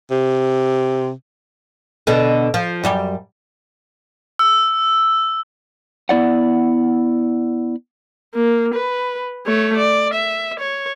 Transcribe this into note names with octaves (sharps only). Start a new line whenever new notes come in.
C3
B2 D3
F3
F#2 G3 G4
E6
B3 E4 D5 F#5
A#3
B4
A3 C#5
D5
E5
C#5